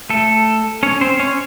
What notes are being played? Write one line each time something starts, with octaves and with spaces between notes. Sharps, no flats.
A3 A4
C#4 C#5
C4 C5
C#4 C#5